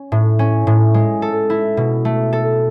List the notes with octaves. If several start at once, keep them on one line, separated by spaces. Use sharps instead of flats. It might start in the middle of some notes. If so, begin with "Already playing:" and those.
Already playing: C#4
A2
C#4
A2
G#3
A4
E4
B2
A3
A4